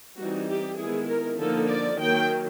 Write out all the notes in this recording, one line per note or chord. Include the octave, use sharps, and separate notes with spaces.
E3 G3 C4 D#4 F#4
G4
D#3 G#3 B3 E4 G#4
A#4
D3 F3 A#3 D#4 A4
D5
D#3 F#3 A#3 G5